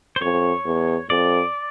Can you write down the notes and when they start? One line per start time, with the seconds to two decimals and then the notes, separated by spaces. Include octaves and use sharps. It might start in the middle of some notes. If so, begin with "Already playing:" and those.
0.16 C5
0.21 F2 C#5
0.65 E2
1.10 F2 D5